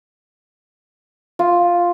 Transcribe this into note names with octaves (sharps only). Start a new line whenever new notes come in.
F4